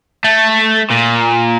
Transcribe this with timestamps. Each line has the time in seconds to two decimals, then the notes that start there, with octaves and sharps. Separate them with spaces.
0.24 A3
0.90 A#2